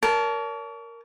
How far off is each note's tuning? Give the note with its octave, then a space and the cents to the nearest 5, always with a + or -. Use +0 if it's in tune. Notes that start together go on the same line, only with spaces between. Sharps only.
A#4 +0 C#5 +40 A5 -10